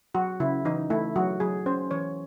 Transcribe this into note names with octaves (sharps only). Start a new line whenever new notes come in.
F#3 F#4
C#3 E4
E3 D#4
A3 E4
F#3 F#4
F#3 G#4
C#4 C5
E3 C#5